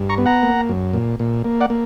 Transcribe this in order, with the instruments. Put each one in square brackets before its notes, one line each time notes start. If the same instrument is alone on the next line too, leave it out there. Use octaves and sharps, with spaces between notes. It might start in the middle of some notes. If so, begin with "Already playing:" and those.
Already playing: [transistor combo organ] G2
A#5 C#6
B3
F#5 A#5
A#3
F#2
A#2
A#2
A#3
D5 F#5
A#3